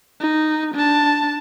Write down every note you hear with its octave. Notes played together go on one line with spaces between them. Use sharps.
D#4
D4 A5